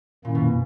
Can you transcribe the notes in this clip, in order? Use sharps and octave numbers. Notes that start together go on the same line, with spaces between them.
F#2 A#2 D#3 A#3 C#4 E4
B2